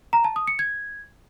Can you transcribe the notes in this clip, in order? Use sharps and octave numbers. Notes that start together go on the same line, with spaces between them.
A#5
A5
D#6
C#7
G#6